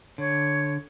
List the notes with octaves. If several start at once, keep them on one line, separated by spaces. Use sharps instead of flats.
D3 C#5